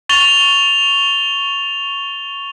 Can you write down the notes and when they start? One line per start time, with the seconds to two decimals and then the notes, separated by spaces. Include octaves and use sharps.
0.09 C#6 A6 F7 G7